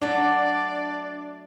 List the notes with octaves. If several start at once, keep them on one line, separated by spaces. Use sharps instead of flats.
F#3 A3 D4 D5